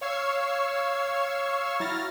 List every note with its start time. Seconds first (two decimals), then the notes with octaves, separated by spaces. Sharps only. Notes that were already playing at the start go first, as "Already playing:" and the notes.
0.01 C#5 F5 C#6 E6 G#6 C7
1.80 F#3 E4 F6 A6 A#6